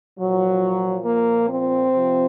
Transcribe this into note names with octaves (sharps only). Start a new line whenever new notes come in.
A#2 F3 F#3
A#3
C4
C3 F3